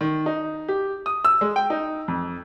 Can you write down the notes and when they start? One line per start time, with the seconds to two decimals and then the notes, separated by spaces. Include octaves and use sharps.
0.01 D#3
0.26 D#4
0.68 G4
1.06 D#6
1.25 E6
1.41 G#3
1.56 G5
1.70 D#4
2.08 F2